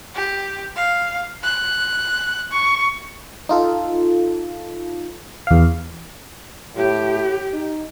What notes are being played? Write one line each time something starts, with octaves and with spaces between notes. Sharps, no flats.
G4
F5
F#6
C#6
D#4 F4 A4
E2 F5
A2 G4
D#4